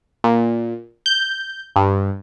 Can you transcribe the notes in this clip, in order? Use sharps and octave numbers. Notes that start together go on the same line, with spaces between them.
A#2
G6
G2